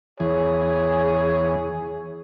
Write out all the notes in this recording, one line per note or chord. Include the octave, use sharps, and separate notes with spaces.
E2 E3 G#4 C#5